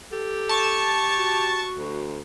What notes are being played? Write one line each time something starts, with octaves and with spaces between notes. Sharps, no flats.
G4 A4
A5 C#6
F#4
D2